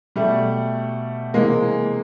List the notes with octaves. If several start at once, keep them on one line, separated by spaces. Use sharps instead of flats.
B2 G3 A3
C3 E3 G#3 A#3